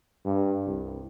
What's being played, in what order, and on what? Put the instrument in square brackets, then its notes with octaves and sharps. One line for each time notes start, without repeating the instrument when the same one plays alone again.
[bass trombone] G2
C2